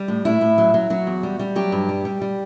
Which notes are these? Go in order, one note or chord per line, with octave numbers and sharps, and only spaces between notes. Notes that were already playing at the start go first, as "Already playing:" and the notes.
Already playing: G3
A2
A2 E4
A2
F#3
F#3
F#3 F#4
E2
G3
G3
F#3 G4
G2
G3
G3
G3